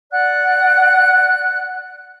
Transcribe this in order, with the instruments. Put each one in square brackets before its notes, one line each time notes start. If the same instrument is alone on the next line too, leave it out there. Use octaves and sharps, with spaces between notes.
[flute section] D5 F#5 F#6